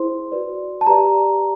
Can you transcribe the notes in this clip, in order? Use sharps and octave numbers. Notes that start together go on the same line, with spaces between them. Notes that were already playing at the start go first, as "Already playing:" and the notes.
Already playing: E4 G#4 C5 C6
F#4 B4 D5
A5
G4 B4 D5 A#5